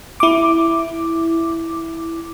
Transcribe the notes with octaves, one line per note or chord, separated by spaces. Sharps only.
E4 D6